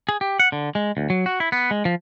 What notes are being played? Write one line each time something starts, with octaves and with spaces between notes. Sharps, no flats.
G#4
G4
F#5
D3
G#3
D2
F#3
F#4
E4
B3
G#3
F3